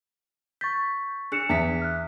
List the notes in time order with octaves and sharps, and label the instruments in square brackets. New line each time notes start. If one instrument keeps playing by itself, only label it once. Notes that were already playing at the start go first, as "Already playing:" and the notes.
[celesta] C#6 A6 B6 [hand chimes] G6
[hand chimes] D4 G#4 [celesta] F#6 C#7 E7
[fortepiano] E2 [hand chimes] E5 B6
[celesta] F6 F#6